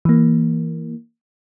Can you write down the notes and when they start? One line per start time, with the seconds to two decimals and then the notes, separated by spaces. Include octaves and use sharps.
0.05 E3 A#3